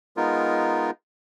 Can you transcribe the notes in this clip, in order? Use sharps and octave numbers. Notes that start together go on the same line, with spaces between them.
G#3 B3 D#4 F4 A#4